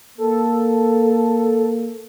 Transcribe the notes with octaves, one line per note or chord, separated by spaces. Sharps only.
A#3 A4